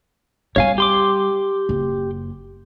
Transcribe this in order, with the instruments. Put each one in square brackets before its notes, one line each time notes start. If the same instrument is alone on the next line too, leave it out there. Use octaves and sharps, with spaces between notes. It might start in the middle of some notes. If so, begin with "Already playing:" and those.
[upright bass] G3 C4 [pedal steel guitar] C#5 F5 G#5
[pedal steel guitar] G4 C6 D6
[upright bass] F#1